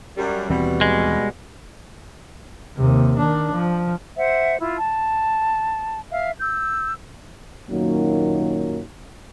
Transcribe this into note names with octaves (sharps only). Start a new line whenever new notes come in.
F#2 G3
D#2 B2 E3 G3 C4
G#3
D#2 C3
D#3 D4
F3
C5 E5 F#5
E4 F4
A5
E5 F5
E6 G6
F#2 A#2 D#3 F#3 A#3 D#4